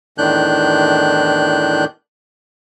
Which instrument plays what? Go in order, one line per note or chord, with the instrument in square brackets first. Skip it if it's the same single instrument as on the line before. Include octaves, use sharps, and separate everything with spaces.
[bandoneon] E2 A2 D#3 D4 F#6 G6